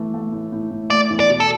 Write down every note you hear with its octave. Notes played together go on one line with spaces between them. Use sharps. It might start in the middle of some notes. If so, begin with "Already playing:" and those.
Already playing: E3 A3
A3
A2
A2
A2
A3 D5
E2
D5
B2
A4